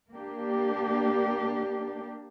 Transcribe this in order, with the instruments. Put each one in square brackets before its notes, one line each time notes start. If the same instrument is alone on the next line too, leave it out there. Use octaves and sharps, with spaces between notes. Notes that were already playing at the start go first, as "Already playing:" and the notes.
[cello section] A#3 D4 G4